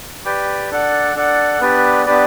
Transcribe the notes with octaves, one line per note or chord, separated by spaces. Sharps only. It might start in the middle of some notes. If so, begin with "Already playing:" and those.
G4 B4 D5 G5
D4 A4 D5 F#5
D4 A4 D5 F#5
B3 D4 G4 B4 D5
B3 D4 G4 B4 D5